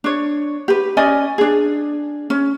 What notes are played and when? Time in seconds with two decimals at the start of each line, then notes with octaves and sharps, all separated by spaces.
0.04 D4 C#5
0.68 G4 B4
0.97 C#4 D5 D#5 G#5
1.38 D4 G#4
2.30 C#4